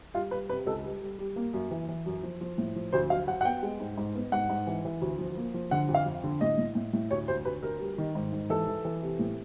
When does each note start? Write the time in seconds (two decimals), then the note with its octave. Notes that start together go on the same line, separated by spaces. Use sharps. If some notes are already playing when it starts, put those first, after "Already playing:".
0.14 G3 F4
0.31 G3 B4
0.49 C3 B4
0.67 C#2 A4
0.84 G3
1.02 G3
1.19 G3
1.36 A#3
1.54 F#2
1.71 E3
1.89 E3
2.06 F#2
2.23 F3
2.41 F3
2.58 A2
2.76 F3
2.93 D2 C5
3.10 F#3 F5
3.27 F#3 F#5
3.41 F#5
3.45 B3 G5
3.63 G#3
3.80 G#2
3.97 G#2
4.15 B3
4.32 G#2 F#5
4.49 G#2
4.67 E3
4.85 E3
5.01 D2
5.19 F3
5.37 A#3
5.54 F3
5.71 D3 F#5
5.89 F2
5.94 F5
6.06 F2
6.24 D3
6.41 A2 D#5
6.58 A2
6.75 A2
6.93 A2
7.11 D2 C#5
7.28 D2 C5
7.45 D2 B4
7.63 D2 A#4
7.80 G3
7.98 D#3
8.15 G#2
8.32 G#2
8.50 E3 A4
8.68 E3
8.85 E3
9.02 C3
9.19 A2